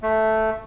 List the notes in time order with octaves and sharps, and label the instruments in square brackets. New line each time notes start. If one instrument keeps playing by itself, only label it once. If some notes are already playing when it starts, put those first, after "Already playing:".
[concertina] A3